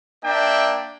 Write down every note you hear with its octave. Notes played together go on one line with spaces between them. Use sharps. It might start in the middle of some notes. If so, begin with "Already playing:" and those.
A#3 D4 E5 G5